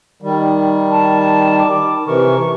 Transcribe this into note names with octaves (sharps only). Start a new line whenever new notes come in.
D#3 G3
A5
D6
C3 E3 A#4 C#6